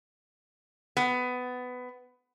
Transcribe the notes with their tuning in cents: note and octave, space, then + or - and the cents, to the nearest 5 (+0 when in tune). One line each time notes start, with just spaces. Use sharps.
B3 +15